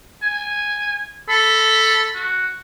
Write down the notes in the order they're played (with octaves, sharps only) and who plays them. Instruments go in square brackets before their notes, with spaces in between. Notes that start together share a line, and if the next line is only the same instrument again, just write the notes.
[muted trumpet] G#5
[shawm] A4 [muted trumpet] B5
[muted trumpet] F#4